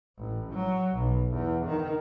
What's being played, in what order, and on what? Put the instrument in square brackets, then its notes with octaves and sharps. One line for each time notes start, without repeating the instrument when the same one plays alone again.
[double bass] A1
F#3
B1
E2
D#3